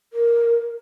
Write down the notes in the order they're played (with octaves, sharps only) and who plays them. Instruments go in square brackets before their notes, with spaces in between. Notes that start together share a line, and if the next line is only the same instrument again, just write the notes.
[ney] A#4